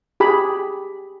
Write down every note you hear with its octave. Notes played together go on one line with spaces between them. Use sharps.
G4 G#4 B5